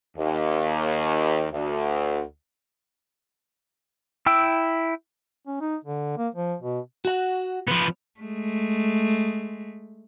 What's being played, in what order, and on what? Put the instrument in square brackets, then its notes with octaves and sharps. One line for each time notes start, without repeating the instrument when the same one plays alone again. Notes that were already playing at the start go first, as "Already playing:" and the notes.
[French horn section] D#2
D2
[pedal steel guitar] E4 G5 E6
[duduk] C#4
D#4
D3
A#3
F3
B2
[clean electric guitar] F#4 F#5
[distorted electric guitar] F3 B3
[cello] G#3 A3